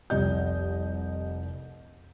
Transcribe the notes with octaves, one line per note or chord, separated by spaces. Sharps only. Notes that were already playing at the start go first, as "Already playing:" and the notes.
F1 C2 D#5 G6